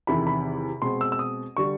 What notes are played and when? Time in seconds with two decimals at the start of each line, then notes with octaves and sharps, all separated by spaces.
0.07 E2 C3 D#3 B5
0.27 B5
0.82 B2 G#3 C4 C6
1.01 E6
1.12 E6
1.19 D#6
1.57 D3 G3 C#6